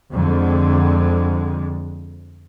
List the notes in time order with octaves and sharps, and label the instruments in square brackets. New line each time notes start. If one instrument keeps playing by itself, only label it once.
[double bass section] F2 D3 G#3